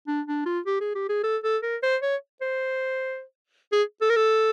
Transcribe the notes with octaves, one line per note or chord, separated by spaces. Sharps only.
D4
D4
F4
G4
G#4
G4
G#4
A4
A4
A#4
C5
C#5
C5
G#4
A4
A#4
A4